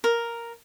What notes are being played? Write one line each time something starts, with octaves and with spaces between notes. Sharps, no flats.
A#4